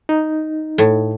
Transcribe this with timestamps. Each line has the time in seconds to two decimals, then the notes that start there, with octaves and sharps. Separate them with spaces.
0.09 D#4
0.78 A2